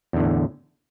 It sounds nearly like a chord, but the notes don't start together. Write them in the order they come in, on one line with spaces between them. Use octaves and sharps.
E2 D3 A2